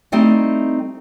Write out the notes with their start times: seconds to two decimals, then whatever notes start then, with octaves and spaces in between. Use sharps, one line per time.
0.12 G3 A3 C4 D#4 E4